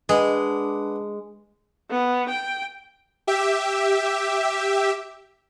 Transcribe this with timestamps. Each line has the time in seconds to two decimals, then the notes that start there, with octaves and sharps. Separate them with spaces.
0.09 G#3 D4 B4 F#5
1.90 B3
2.29 G5
3.27 G4 E5